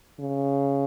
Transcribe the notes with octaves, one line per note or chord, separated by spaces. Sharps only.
C#3